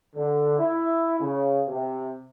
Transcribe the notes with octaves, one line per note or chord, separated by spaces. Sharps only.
D3
E4
C#3
C3